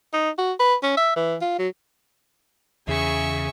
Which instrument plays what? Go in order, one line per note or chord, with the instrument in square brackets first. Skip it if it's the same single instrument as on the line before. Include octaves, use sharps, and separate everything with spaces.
[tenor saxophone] D#4
F#4
B4
C#4
E5
E3
F4
F#3
[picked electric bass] E2 [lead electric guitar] C#3 [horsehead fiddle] G#4 [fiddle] E5 C#6